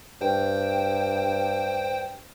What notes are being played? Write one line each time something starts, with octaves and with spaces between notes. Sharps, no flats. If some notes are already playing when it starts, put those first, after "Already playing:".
G2 C5 G5